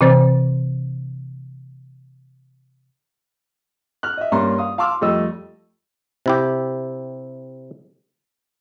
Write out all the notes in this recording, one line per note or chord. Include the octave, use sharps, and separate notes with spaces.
C3 E3 C4 C5 A6
F6 F#6
D#5 E5
G2 A#3 C#4 A#5 C6
F5 D#6
F5 A5 C6 D6 E6 F6
F2 G3 A3 D#5 E6
C3 E4 G4